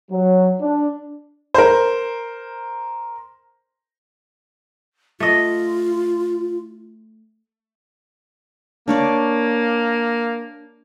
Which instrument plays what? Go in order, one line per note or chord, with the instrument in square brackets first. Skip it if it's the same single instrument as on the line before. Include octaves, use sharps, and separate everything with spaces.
[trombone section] F#3
D4
[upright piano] A#4 C5
[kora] A3 D#5 [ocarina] F4
[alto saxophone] A#3 [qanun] D4 C#5 D5